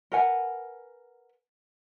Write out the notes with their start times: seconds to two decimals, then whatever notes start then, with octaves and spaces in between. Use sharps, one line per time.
0.12 A#4 B4 F#5 G#5